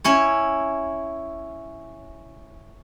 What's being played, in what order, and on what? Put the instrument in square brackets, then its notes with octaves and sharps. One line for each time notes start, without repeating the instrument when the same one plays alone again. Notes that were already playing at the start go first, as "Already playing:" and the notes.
[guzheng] C#4 E4 C#5